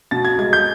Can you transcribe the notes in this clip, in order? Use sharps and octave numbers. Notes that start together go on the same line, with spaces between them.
B2 A6
G#6
G#3 G#6
G6